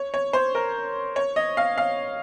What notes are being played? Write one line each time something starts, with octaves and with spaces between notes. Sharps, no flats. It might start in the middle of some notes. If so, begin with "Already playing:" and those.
Already playing: C#5
C#5
C5
A#4
C#5
D#5
F5
F5